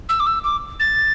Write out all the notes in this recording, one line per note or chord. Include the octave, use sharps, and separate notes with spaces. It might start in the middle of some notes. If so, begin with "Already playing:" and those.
E6
D6
E6
D6
A6